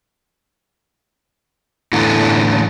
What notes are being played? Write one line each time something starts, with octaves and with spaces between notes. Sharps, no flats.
A2 D3 E3 B3 A4